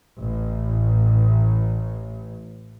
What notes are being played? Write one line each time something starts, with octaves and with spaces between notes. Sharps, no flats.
A1 A2